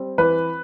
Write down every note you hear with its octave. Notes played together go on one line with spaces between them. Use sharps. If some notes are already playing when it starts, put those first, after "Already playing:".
Already playing: G3 C4
E3 B4